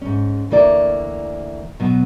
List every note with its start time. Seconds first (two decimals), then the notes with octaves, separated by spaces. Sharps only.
0.01 G#2 C#4
0.51 D2 E3 A#3 D5
1.80 B2 F#3 B3